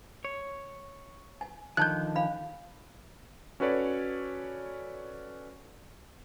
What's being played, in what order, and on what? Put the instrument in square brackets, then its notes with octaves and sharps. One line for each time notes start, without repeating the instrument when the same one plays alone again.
[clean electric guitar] C#5
[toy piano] G#5
[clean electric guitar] D3 D#3 F3 [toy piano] D#5 A5 [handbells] F#6 G6
[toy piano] D4 F5 B5
[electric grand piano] C#4 F#4 A4 B4 C#5 D5